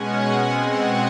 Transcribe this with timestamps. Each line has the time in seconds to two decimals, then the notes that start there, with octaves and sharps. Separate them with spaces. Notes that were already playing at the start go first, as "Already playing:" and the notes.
Already playing: B2 G#3 C#4 F#5 G#5
0.35 B2 G#3 C4
0.66 F#5 G#5